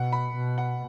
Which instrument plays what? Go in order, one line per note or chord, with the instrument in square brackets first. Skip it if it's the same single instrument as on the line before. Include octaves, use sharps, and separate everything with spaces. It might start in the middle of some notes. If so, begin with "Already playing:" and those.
Already playing: [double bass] B2 [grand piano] F#5
[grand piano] B5
[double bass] B2
[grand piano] F#5